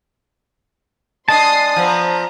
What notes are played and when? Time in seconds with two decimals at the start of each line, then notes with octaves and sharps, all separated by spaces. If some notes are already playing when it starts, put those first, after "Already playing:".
1.28 G#3 D4 A5 C6 D#6 C7
1.76 F3 B3 C4 A#5